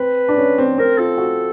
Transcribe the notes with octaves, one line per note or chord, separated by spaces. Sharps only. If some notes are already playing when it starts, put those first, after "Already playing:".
Already playing: C4 B4
D4
C#4
C4
C4 A#4
F4 A4
F#4